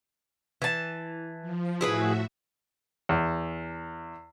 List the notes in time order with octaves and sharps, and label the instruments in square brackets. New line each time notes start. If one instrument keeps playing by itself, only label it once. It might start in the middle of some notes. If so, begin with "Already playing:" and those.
[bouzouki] E3 A5
[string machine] F3
[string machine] A2 F#4 E5 [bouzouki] E4 G#4 B4
[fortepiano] E2